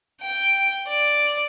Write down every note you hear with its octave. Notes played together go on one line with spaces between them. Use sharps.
G5
D5